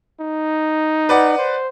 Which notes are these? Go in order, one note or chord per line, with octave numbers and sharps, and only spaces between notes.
D#4
B4 D5 F#5
C5